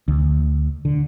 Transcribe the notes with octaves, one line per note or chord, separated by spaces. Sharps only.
D2
D3